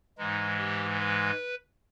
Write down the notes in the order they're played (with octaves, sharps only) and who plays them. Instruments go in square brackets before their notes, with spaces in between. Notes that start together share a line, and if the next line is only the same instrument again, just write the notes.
[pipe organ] G#2 E3 G#3 D#4
G4
B4